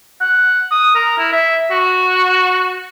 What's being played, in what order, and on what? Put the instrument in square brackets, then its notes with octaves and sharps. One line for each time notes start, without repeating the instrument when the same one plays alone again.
[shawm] F#5
D#6
A#4
E4
E5
F#4